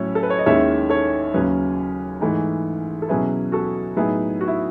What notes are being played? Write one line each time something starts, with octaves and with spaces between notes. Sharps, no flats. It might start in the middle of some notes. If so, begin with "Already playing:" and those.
Already playing: A2 F#3 C#4 E4 C#5
A4
B4
C#5
D#5
D#2 D#3 G#3 C#4 E4 C#5 E5
A4 C#5
D#2 C#3 F#3 C#4 G#4 B4
G#2 E3 A3 D#4
A4
B2 F#3 C#4 E4 G#4 B4
F#4 A4
A2 F#3 B3 D#4 E4 G#4
F#4
E4